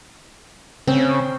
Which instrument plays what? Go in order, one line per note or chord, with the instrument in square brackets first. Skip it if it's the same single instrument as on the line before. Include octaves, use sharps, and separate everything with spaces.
[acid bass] C#3 [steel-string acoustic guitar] C4